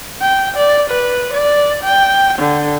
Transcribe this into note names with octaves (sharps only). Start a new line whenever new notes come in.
G5
D5
B4
D5
G5
D3